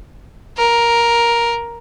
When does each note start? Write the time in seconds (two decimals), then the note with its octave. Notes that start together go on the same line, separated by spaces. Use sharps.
0.57 A#4